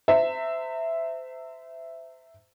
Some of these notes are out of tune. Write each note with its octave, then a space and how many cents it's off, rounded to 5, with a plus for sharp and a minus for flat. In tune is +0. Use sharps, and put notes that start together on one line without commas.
C5 -30 E5 +0 A#5 -40